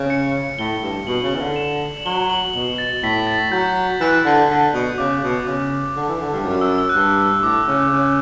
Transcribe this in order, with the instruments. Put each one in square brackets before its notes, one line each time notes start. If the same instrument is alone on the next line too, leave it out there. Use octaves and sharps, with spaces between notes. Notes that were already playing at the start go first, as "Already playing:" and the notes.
Already playing: [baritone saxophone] C#3
[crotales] C#7
[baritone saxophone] A2 [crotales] G7
[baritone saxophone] G2
[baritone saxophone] B2 [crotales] F#7
[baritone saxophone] C#3
E3
D3
[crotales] E7
F#7
[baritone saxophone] F#3 [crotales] G7
[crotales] F#7
[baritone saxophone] B2 [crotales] F#7
[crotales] A6
[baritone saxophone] A2 [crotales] B6
[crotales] A6
[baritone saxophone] F#3 [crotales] G6
[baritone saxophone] E3 [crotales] F#6
[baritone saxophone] D3
D3
B2
[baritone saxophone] C#3 [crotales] D6
[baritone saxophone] B2 [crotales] D6
[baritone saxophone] C#3 [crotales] D6
[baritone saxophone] D3
E3
D3
G2
F#2
[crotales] E6
E6
F#6
[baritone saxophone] G2 [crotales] E6
[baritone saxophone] A2 [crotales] D6
[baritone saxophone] C#3
C#3